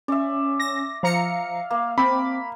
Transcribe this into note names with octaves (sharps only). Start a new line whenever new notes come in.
C#4 D5 E5
A#6
F3 F5 A#5 C#7
A#3
C4 B5 D6